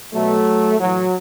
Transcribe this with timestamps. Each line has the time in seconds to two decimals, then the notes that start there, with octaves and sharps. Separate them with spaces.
0.13 B2 F#3 A3
0.79 A2 E3 F#3